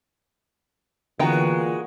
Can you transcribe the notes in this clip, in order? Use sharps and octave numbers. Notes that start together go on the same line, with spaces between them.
A#2 D3 E3 G#3 B3 F#4 G5 A#5